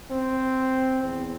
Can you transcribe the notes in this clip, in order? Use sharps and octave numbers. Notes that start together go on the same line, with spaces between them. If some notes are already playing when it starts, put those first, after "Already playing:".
C4
E2